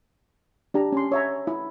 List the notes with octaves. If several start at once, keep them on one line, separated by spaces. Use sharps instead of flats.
D4 G4 A#5
C#4 C6
C#5 E5 A#5
E4